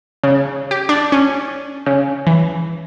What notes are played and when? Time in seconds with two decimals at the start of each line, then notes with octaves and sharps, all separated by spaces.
0.23 C#3
0.71 G4
0.89 D4
1.12 C#4
1.86 C#3
2.27 E3